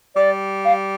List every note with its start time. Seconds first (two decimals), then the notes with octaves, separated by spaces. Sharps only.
0.16 G3 D5
0.65 F5